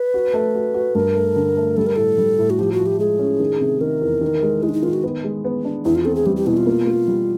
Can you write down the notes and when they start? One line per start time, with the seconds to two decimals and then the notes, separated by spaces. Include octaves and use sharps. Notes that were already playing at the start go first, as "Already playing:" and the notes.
Already playing: B4
0.14 F#4
0.34 A3
0.55 F#4
0.74 F#4
0.95 G2 A#4
1.15 A3
1.36 D3
1.57 A3
1.77 G3 A4
1.87 A#4
1.96 A2 A4
2.18 G3
2.39 A2
2.50 F#4
2.59 F3 G4
2.72 F#4
2.79 F3
2.86 G4
2.99 G#3 G#4
3.19 C#4
3.40 D#3
3.61 C3
3.81 D#3 A#4
4.02 E2
4.21 D#3
4.43 G#3
4.63 G#3 E4
4.69 D4
4.73 D#4
4.82 D#3 F4
4.93 F#4
5.03 B3
5.24 G#3
5.45 B3
5.65 D4
5.85 E2 E4
5.95 F4
6.05 C4 A4
6.15 G#4
6.26 G3 G4
6.36 G4
6.46 B2 E4
6.57 F4
6.67 A#3
6.87 A#3
7.08 G3